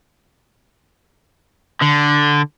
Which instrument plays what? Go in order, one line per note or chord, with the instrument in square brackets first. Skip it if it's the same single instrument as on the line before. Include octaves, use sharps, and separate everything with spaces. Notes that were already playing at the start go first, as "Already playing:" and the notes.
[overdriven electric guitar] D3